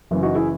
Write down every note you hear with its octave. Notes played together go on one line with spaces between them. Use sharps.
F#1 F#2 E3
D#4 F#4
E4 G#4